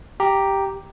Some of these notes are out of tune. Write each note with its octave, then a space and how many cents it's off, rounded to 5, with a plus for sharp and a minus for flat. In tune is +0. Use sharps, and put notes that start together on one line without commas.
G4 +0 A#5 +0